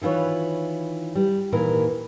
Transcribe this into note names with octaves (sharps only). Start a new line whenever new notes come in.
D#3 E3 F4 B4 C#5
G3
D#2 A#2 E3 A#4 B4